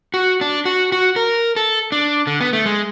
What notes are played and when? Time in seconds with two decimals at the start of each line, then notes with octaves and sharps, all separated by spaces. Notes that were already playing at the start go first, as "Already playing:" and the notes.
0.14 F#4
0.41 D4
0.65 F#4
0.92 F#4
1.16 A#4
1.56 A4
1.92 D4
2.27 D3
2.41 B3
2.53 A3
2.66 G#3